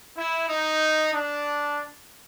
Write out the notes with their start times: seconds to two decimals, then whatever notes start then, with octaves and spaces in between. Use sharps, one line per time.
0.15 E4
0.48 D#4
1.13 D4